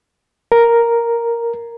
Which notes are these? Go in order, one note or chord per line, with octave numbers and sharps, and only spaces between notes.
A#4